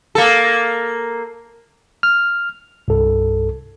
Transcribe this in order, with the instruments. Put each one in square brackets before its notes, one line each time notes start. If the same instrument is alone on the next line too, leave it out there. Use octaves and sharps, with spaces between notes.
[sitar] A#3 A4
[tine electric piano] F6
[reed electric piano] C2 G2 A4